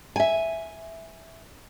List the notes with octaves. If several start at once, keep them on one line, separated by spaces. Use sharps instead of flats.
E5 G#5